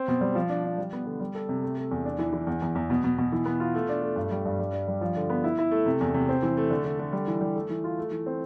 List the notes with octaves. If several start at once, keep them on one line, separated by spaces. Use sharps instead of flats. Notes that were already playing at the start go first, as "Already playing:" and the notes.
Already playing: C4
B2
G3
F3
D4
D4
G3
B3
D3
G3
A4
C3
A3
A3
E2
D4
E3
E3
E2
E2
E2
B2
B2
B2
E3
B3
F4
A3
D4
A3
G2
G3
G2
G3
D4
G3
F3
D3
B3
E4
E4
A3
C3
E2
C3
C4
E3
A3
D3
D3
D3
G3
E3
G3
A3
E3
F4
A3
E3
C4